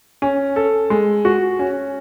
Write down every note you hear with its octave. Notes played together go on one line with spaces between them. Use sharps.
C#4
A4
G#3
F#4
C#4